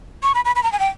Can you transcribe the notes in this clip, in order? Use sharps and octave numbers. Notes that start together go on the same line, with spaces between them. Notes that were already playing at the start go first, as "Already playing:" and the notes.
C#6
B5
B5
B5
A#5
G#5
G5